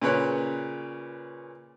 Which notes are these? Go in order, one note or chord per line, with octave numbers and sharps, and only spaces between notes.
A#2 C#3 B4 C#5 F#6